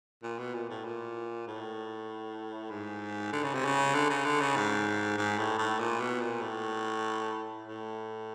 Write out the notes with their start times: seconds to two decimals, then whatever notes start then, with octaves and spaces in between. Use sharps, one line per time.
0.23 A#2
0.38 B2
0.54 A#2
0.69 A2
0.84 A#2
1.47 A2
2.70 G#2
3.32 D3
3.43 C#3
3.54 C3
3.65 C#3
3.94 D3
4.09 C#3
4.24 D3
4.40 C#3
4.56 G#2
5.18 G#2
5.38 A2
5.58 A2
5.79 A#2
6.00 B2
6.20 A#2
6.41 A2
7.64 A2